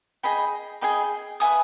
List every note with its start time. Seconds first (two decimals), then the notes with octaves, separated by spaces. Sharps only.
0.23 G#4 D#5 G5 B5
0.81 G#4 D#5 G5 B5
1.40 B4 E5 G#5 D#6